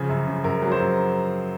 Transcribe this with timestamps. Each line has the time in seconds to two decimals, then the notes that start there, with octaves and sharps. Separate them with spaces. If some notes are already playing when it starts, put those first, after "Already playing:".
Already playing: C#3 F3 G#4
0.09 F#2
0.27 C#3
0.44 F#2 A#4
0.62 F#3
0.72 C5
0.80 F#2